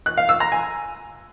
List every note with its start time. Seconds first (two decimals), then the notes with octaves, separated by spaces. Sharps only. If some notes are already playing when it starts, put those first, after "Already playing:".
0.06 F#6
0.18 F5
0.29 E6
0.40 A#5
0.52 G#5